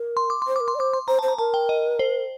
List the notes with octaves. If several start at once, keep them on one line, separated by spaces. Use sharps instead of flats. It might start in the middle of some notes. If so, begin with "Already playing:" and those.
Already playing: A#4
C6
D6
C6
C5
A#4 D6
C6
D5
C5 D6
C6
C5 A#5
A5
C5
A#5
A#4 A5
G5
D#5
C5